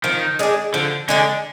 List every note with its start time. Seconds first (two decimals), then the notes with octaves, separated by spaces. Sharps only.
0.04 D#3 F3
0.39 G#3 D4 G#4
0.74 D3 F3
1.09 D3 G#3 D4 G#4